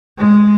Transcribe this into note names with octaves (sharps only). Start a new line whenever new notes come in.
G#3